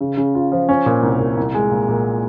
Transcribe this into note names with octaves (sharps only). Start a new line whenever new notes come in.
C#3
C#3
F4
F3
C#4
A#2
C2
A#2
C2
G#3
A#2
A#2